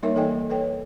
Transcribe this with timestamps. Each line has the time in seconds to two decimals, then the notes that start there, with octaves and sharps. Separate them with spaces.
0.02 G3 A#3 D#4 A#4 C#5 E5
0.15 E3 D#4 A4 D#5 G5 G#5
0.49 A4 B4 C#5 G5